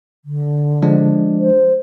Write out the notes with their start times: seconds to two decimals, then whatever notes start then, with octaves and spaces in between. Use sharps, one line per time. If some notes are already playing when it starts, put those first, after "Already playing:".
0.25 D3
0.82 F3 G#3 D4
1.40 C5